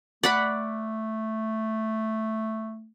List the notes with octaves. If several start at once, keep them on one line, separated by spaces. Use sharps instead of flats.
A3 D5 F#5 B5